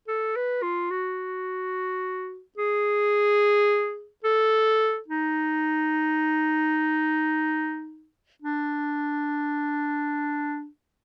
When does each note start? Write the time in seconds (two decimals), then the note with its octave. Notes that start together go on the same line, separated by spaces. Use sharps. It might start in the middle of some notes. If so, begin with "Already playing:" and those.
0.08 A4
0.36 B4
0.63 F4
0.91 F#4
2.58 G#4
4.24 A4
5.08 D#4
8.42 D4